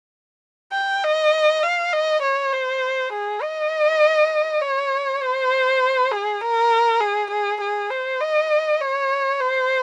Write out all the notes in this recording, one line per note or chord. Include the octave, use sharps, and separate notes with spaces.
G5
D#5
F5
D#5
C#5
C5
G#4
D#5
C#5
C5
G#4
A#4
G#4
G#4
G#4
C5
D#5
C#5
C5